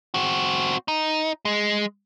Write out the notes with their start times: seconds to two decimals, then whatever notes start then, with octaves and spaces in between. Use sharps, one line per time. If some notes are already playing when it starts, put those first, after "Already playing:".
0.14 C4 F#4
0.88 D#4
1.45 G#3